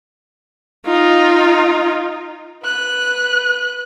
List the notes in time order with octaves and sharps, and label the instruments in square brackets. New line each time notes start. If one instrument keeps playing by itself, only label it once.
[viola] D#4 F4
[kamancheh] B4 F#6